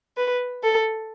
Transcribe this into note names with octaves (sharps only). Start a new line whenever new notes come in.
B4
A4